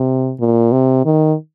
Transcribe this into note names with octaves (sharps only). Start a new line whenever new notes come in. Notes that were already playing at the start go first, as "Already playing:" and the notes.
Already playing: C3
A#2
C3
D#3